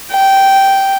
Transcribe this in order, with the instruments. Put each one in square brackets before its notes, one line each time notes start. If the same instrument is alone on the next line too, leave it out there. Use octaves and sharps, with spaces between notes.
[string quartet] G5